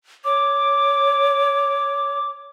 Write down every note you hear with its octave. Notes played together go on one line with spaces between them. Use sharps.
C#5 D6